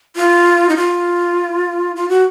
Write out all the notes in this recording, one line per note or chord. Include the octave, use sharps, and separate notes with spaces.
F4
D#4
F4
F4
F#4